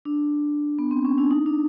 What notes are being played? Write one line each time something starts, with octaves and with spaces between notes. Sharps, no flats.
D4
B3
C4
C#4
D4
D#4
D4